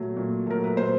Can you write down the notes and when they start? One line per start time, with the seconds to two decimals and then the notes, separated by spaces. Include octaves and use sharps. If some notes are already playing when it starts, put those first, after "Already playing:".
Already playing: A#2 F#3 A3
0.16 A#2
0.46 F#3 A3 A#4
0.64 B4
0.76 A#2 C5